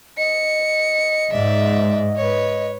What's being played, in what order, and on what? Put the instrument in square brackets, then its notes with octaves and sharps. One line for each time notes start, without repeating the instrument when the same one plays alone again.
[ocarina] D#5 [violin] C#7
[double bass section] G#2 [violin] D5 E5
[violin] B4 C#5